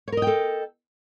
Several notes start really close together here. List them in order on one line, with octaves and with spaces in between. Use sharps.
C#5 A#4 D#5 G5 A4